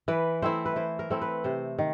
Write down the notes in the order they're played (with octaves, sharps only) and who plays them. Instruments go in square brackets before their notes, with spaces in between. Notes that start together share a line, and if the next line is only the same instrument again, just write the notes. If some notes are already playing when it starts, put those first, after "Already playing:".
[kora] E3 B4
A3 C4 E4 C5
B4
E3 C5
A#4
A3 C4 E4
B4
C3 C5
D#3